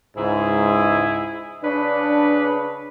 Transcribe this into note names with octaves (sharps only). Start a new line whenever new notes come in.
C#2 G#2 E4 G#4
C#3 D4 B4